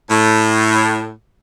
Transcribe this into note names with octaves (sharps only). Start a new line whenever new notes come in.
A2